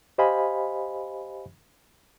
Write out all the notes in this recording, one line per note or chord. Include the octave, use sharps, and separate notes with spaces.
G4 C5 D#5 F5 G#5 B5